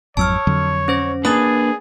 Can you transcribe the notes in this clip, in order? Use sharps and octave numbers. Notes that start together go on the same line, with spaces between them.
G#1 F2 F#3 C#5 A5 E6 F6
F2 D3 F#3
C#4 C5 A#6
A#3 D4 G#4 B4 D#6 A6